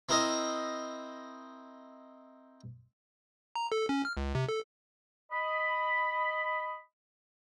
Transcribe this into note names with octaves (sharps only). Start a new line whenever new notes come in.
C4 E4 A#4 C5 D#5
A#5
A4
C#4
F6
C#2
C3
A4
D#5 B5